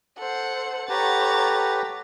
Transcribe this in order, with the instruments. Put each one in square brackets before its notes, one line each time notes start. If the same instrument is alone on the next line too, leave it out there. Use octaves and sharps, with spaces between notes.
[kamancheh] A4 C5 [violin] F#5
[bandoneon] G4 B4 [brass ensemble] A4 F#5 [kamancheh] C#5 [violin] A#5 A6